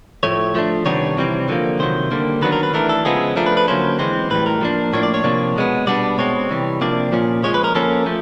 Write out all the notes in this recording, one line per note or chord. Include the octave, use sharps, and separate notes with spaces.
A2 F3 A3 C#5
F3 A3 D4
C3 D#3 G3 B3 D4 C#5
C3 E3 G3 C4
D3 F3 A#3
C3 D#3 F#3 C5
D3 G3 A#3
D#3 F#3 B3 D4 B4
A#4
B4
E3 A3 D4 A#4
A4
C#3 F3 G#3 B3 G#4
F3 A3 D4 A#4
B4
B4
D3 F#3 A#3 C#4 C5
E3 G#3 C4 C5
A2 E3 G3 B4
A#4
F3 A#3 D4
A2 F3 A#3 D4 C#5
D5
C#5
C3 F3 A#3 D4
B2 G#3 B3
B2 G3 B3 D4 D5
B2 G#3 C4 C#5
C3 E3 G3
C3 F3 A#3 D4 D5
A#2 F3 A#3 C#4
F3 G#3 C#4 C#5
B4
A#4
F3 A#3 C#4 A4
F3 A3